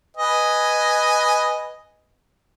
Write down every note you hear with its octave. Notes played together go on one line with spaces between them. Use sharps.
B4 D#5 G#5